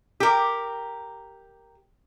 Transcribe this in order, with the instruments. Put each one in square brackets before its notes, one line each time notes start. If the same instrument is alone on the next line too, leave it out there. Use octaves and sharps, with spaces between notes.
[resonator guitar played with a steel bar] G4 A#4